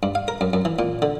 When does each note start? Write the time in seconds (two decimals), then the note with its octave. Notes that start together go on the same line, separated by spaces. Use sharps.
0.03 G2
0.15 F5
0.28 A#4
0.41 F#2
0.53 F#2
0.65 E3
0.79 A#2
1.02 D3